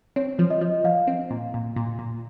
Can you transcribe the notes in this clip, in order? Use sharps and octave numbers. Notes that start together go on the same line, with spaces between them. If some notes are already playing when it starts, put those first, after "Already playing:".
C4 C#5
F3
D#5
F3
F3 F5
C4
A#2
A#2
A#2
A#2